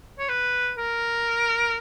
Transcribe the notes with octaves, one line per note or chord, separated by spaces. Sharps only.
C#5
B4
A#4